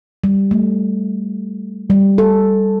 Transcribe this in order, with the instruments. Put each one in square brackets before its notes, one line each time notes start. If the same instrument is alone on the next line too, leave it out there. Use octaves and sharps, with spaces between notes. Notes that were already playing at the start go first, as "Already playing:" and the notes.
[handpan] G3
A3
G3
A4